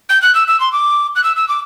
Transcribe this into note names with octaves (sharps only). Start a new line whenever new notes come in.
G6
F#6
E6
E6
C6
D6
F#6
E6
E6
D6